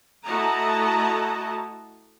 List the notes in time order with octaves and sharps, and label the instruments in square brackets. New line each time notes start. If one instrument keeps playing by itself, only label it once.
[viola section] A3 E4 F#4 D#5 A5 A#5